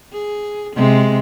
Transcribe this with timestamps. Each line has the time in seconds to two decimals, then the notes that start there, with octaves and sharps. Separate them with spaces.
0.13 G#4
0.75 C3 G#3